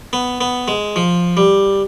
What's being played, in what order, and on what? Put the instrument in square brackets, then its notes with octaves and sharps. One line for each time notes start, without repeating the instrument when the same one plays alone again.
[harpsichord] B3
B3
G#3
F3
G3